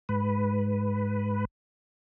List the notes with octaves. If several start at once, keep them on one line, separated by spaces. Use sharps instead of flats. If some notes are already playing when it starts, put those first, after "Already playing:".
G#2 B4